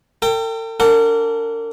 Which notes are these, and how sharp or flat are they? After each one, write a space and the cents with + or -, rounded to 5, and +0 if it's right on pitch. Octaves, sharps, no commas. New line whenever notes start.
A4 +45 G5 +0
D4 -25 A#4 -35 F#5 +0